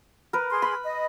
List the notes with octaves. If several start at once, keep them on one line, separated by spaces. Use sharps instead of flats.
A#4 B4
G#4 C6
B5
D#5